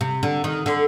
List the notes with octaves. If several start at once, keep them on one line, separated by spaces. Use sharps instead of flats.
C3
D3
D#3
D3